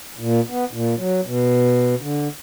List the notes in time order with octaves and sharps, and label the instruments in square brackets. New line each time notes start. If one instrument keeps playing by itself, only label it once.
[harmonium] A#2
B3
A#2
F#3
B2
D3